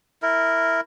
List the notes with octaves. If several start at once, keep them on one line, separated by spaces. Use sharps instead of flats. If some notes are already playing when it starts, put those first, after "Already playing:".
E4 A#4